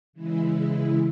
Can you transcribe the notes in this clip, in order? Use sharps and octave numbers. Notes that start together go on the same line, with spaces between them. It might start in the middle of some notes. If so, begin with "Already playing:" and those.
C#3 E3 G#3 E4